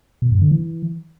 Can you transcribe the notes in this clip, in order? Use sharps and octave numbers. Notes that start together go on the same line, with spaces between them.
B2
G2
D3
E3